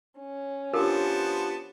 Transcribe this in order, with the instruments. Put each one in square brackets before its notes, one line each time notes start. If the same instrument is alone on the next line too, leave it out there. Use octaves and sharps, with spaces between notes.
[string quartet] C#4
[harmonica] F3 B3 A5 [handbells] D4 F4 G4 [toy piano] A4 A#4